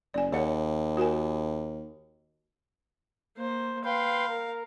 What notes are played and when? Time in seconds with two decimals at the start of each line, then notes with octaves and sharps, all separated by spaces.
0.14 F#1 D5 G#5
0.32 D#2 G#4 C#5 F#5
0.97 F#4 A#4 G#5
3.37 A#3 C5
3.84 B4 F5 G5 C6
4.28 A#4